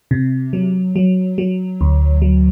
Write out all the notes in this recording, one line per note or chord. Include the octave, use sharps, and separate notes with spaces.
C3
F#3
F#3
F#3
D2
F#3